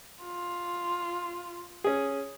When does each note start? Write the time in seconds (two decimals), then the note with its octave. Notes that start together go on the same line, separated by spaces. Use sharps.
0.24 F4
1.84 C#4 G#4